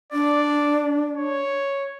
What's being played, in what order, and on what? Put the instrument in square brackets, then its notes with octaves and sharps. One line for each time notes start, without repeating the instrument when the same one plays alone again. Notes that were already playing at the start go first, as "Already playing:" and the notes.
[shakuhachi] D4 [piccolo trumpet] D5
[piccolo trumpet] C#5